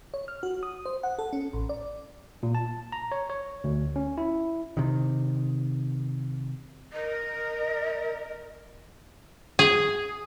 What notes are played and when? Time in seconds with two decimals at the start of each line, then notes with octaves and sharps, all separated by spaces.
0.14 C#5
0.28 F6
0.43 F#4
0.63 D#6
0.86 C5
1.03 F#5
1.19 A4
1.33 C#4
1.53 A1
1.69 D5
2.43 A#2
2.55 A5
2.92 A#5
3.12 C#5
3.30 C#5
3.64 D2
3.96 C#4
4.18 E4
4.77 C3 D#3
6.93 A#4 D#5
9.59 G#4